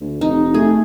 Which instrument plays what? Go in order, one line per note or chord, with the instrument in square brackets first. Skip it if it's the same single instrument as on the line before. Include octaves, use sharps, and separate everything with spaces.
[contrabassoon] D2
[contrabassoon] F1 [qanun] D#4
[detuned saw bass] A3 [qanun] G#4